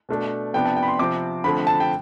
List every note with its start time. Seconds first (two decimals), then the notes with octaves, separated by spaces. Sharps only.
0.09 B2 A3 D4
0.54 C3 F3 B3 D4 G5
0.66 A5
0.77 G5
0.83 B5
0.88 C6
0.99 C3 F3 C4 D6
1.44 D3 F3 A3 C4 B5
1.67 A5
1.80 G5